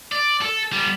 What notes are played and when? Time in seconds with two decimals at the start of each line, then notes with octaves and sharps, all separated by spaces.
0.12 D5
0.41 A4
0.73 G3 B3